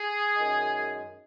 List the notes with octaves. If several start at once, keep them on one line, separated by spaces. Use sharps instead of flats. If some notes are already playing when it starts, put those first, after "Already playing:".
Already playing: G#4
F#2 D#3 G#3